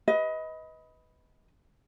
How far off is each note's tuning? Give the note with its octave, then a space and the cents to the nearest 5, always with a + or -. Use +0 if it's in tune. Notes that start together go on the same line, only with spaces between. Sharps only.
B4 +0 D#5 +25